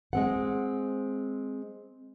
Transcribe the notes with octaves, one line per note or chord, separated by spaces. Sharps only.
G#3 C4 F#5